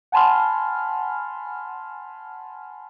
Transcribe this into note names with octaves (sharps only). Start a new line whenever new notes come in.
F#5 G#5 A5 B5 C6 F6